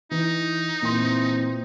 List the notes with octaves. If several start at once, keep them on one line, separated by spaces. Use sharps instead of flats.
E3 D#4
A#2 E3 C4 C6